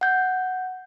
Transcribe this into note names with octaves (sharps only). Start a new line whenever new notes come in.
F#5 G6